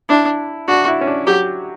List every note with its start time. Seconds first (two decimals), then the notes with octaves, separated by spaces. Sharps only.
0.09 D4 E4
0.68 D4 F#4
0.88 E4
1.01 C#4
1.07 D4
1.26 F#3 G4